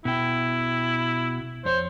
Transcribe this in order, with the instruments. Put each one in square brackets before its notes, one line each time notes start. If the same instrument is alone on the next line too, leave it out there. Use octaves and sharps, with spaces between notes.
[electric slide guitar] B2 G5 [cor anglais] E4
[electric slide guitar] F2 C#5 [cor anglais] C5